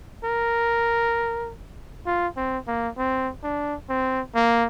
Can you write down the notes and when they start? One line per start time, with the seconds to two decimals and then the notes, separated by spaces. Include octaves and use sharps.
0.24 A#4
2.06 F4
2.37 C4
2.67 A#3
2.98 C4
3.43 D4
3.89 C4
4.35 A#3